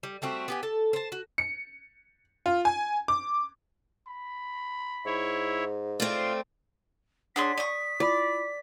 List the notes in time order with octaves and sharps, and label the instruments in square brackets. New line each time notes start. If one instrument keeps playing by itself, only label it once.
[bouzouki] G3
G3 A3 C4 F#4
B3 G4 G#5
A4 A5
C5 A5
F#4
[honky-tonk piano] C#7
F4
G#5
D6
[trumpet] B5
[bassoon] G#2 [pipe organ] E4 C#5
[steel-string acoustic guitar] A3 C4 [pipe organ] F4 [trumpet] D5
[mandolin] D4 G#4 C6 [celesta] C#5 F#5 [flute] B6
[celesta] D5 [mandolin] C#6 D#6
[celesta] E4 F4 B5 [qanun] D5